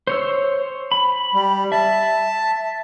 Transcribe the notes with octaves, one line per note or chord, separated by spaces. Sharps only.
C5 C#5 E6
B5
G3
E5 A5